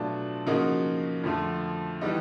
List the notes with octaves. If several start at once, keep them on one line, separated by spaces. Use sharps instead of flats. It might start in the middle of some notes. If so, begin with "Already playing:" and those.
Already playing: B2 F#3 A3 D4 F4
C#3 F3 A#3 D#4 F#4
F2 D3 F3 A3
E3 G3 B3 D#4